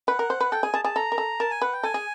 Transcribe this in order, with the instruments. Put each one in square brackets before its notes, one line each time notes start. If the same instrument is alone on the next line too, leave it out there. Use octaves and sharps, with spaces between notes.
[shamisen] B4 [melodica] F#5
[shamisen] A#4
C5
B4
[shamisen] A4 [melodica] G5
[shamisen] G#4 [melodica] G#5
[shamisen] G#4 [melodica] A5
[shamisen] G#4 [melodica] A5
[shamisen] A4 [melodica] A#5
[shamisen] A#4
A4
[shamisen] A#4 [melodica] A5
[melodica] G#5
[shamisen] B4 [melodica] F#5
[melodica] G5
[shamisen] A4 [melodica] G#5
[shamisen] G#4